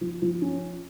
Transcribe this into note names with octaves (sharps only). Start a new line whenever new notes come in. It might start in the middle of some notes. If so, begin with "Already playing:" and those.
F3
F3
C#4